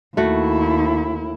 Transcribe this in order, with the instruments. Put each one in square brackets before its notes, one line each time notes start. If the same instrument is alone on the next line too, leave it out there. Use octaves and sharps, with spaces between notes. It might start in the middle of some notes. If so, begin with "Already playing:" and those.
[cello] D#2 E4 [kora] A3 F#4